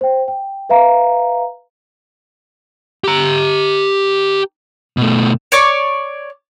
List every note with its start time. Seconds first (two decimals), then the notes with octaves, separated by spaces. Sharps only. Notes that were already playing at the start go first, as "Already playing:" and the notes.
0.01 C5 G5
0.28 G5
0.69 B4 E5 F5 A#5
3.04 G4 A#5
4.97 B2 A3
5.52 C#5 D5 C#6 D6